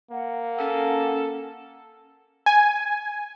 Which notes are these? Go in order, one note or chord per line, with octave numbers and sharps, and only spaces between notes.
A#3 F#5
C#4 A4
G#5